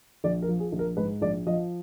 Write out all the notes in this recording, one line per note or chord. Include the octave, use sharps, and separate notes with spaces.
A#1 D5
A#4
F3
G#4
A#1
A#4
G#2 B4
A#1 D5
F3 D#5